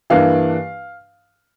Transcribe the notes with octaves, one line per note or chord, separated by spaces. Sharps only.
G2 E3 A#3 D4 F5